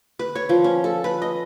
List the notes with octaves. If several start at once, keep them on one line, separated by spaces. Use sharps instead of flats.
B4
C#5
F3
C#4
A4
B4
D#5